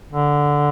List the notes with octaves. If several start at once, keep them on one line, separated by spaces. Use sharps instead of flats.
D3